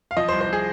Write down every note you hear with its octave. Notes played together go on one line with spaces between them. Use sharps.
F5
F3 D#5
C5
C2
C5
F3 G#4